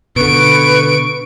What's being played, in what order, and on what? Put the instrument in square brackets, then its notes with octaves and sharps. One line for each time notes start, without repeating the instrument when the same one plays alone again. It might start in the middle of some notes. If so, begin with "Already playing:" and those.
[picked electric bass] B2 D3 [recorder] B4 [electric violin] C#6 D7